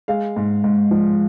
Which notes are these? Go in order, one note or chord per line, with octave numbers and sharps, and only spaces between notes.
G#3 F5
G#2
G#2
F3